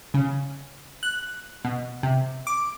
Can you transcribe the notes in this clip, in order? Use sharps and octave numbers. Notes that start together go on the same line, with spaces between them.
C#3
F#6
B2
C3
D6